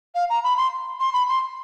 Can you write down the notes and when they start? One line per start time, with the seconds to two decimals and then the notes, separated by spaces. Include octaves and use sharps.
0.15 F5
0.30 A#5
0.43 B5
0.57 C6
1.00 C6
1.13 B5
1.28 C6